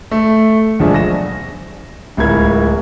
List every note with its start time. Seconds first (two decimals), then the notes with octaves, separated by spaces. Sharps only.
0.11 A3
0.79 E1 F#2 F3 D4 G#4 E5
0.94 A#6 E7
2.17 D1 C#2 E4 A#4 B5 G#6